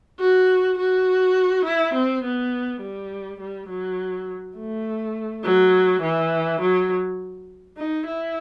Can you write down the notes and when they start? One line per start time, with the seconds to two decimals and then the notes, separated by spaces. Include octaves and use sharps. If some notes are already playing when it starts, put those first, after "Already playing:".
0.19 F#4
0.78 F#4
1.65 E4
1.95 C4
2.24 B3
2.81 G3
3.40 G3
3.69 F#3
4.57 A3
5.44 F#3
6.02 E3
6.61 F#3
7.77 D#4
8.06 E4